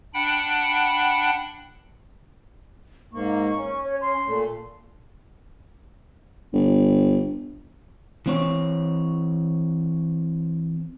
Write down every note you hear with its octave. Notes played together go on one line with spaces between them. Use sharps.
D4 F#5 G5 B5
G#2 A#3 C#6
C#4
C#5
C6
A#2 A3
G1
E3 C4 C#5